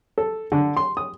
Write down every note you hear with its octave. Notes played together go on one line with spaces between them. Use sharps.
A4
D3
C6
D#6